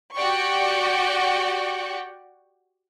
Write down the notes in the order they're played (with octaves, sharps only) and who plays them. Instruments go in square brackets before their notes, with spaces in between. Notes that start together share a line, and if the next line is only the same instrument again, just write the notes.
[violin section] F#4 G4 D5 F#5 G5 C#6